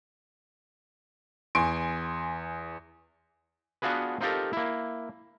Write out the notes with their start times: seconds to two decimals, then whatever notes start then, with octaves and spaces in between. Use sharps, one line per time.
1.55 E2 G#5 C6 D7
3.82 B3 D4 F4 F#4 G#4 B4
4.21 C4 D#4 F4 G4 A4 A#4
4.53 A#3 E4